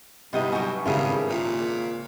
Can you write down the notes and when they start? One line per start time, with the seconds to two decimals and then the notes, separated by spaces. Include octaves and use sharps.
0.33 G2 C3 G3 B3 D#4 E4 D#5
0.52 F#3 F#4 G#5 G6
0.86 G#1 G2 C#3 E4 G#4 A#4
1.29 A#2